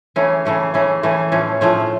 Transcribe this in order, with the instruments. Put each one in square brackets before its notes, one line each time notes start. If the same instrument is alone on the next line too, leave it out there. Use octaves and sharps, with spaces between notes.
[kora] C#3 E3 A3 C#4
C#3 E3 A3 C#4
C#3 E3 A3 C#4
C#3 E3 A3 C#4
A2 F3 A3 C#4
A2 F3 A3 C#4